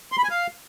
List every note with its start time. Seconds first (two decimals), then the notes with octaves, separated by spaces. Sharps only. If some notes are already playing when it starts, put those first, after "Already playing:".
0.12 C6
0.18 B5
0.24 G#5
0.30 F5